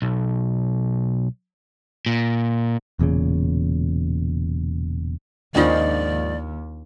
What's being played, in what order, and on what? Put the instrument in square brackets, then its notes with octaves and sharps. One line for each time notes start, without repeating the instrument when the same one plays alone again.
[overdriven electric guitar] B1
A#2
[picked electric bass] E1 E2 A#2 C#3
[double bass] D#2 [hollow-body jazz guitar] G#2 D#3 F3 [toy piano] C#4 D4 F4 [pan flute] D5